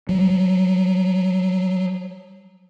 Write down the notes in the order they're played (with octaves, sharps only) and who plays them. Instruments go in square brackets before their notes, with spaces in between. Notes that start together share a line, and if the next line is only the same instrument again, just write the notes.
[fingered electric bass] F#3 G3